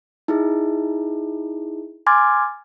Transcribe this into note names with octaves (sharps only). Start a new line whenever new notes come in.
D#4 E4 G#4
G#5 C6 D6 F6 G#6 A6